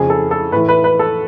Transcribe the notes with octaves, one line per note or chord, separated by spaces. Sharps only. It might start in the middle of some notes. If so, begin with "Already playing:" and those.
Already playing: F2 C#3 F3 G#4
A4
A4
A2 E3 B4
B4
B4
A4